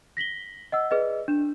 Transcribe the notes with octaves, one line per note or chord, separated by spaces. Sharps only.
A#6 B6 F#7 G7
D#5 F#5 E6
G#4 B4 D5 D#5
D4 E7